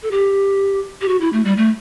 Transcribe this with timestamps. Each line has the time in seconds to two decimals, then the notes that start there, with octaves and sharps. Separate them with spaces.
0.03 A4
0.11 G4
1.01 G4
1.08 F#4
1.21 E4
1.33 A3
1.45 G3
1.57 A3